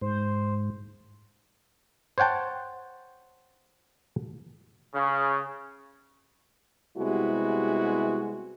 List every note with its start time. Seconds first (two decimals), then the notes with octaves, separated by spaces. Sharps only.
0.01 G#2 C5
2.18 C5 C#5 F#5 G5 A5
4.94 C#3
6.97 C3 G3 G#3 B3 E4 F#4